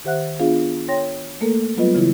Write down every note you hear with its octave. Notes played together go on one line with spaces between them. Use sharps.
D#3 G4 C5 E5 F#5 F#6
B3 D4 F4 G#4 F5
C#5 G5 C6 A#6
A3 A#3 A4 A#4
F#3 G3 B3 F4 B4 D#5
C#3 E3 E4